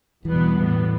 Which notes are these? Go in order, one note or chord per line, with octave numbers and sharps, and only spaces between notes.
E2 B2 E3 G3 B3
A2 G3 B3